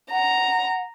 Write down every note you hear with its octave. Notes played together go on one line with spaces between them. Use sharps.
F#5 A#5